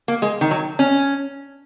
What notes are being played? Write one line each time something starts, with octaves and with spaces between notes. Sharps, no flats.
A#3
G#3
D#3
F#3
C#4